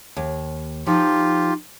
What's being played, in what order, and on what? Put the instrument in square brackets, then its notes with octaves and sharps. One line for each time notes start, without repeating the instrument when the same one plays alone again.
[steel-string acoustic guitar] D#2
[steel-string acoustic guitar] F3 [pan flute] D#4 [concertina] F4 G4